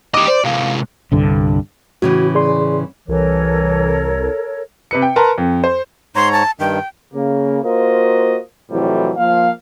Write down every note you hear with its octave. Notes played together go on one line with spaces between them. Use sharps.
G4 D#5 D6
C5 D5
C3 G#3 F5
C2 G2 D3
A2 C#3 E3 F#4
G#4 D5 C6
C2 E3 A4 A#4 C#5
C3 B4 C#7
G5
A#4 B4 A5 A#5 C6
F2
C5
G#2 C#5 A#5 C6
A5
G2 D#3 G5
C#3 A#3
A#3 F4 F#4 A#4 C5 D#5
F2 A2 C3 E3 F#3 G3
F3 A#3 F5